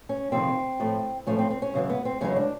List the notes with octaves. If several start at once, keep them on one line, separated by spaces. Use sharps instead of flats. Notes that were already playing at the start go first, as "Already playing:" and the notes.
C#4
F2 C3 D#3 C4
A2 F3 A3
A2 F3 A3 C#4
C4
C4
C#4
F#2 C#3 E3 G#3
B3
C4
F#2 C#3 E3 G#3 C#4
D4